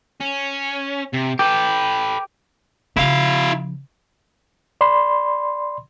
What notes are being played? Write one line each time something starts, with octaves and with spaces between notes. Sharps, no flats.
C#4
C3
G4 A4 B4
C#3 F3 E4 F5
D5 B5 C6